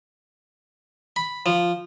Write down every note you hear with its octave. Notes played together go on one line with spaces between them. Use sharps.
B5
F3